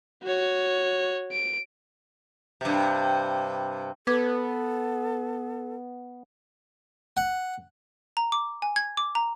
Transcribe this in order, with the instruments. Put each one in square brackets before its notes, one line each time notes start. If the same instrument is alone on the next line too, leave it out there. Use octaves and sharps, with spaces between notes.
[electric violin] F#4 C#5
D7
[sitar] G2 C3
[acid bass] B3 [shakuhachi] A4 [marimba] B4 D6 G#6
[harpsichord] F#5
[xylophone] A#5
D6
G#5
G#6
D6
A#5